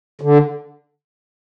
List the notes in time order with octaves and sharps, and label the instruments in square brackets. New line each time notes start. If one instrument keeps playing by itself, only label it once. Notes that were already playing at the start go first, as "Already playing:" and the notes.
[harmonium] D3